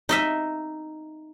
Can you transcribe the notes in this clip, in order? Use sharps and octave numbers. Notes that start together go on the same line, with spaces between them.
D#4 D#5 E5